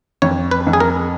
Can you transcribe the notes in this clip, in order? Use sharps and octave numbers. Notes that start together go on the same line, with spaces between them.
F2 C#5
B4
F2
G#4
A#4